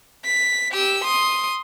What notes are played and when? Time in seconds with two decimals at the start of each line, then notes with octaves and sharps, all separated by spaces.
0.25 B6
0.71 G4 E6
1.04 C6 D#6